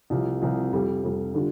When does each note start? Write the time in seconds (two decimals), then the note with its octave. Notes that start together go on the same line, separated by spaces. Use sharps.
0.10 C2 C3 F3
0.42 C2 C3 F3
0.72 F2 C3 G3
1.03 F2 C3 G3
1.34 D3 G3 D4 F4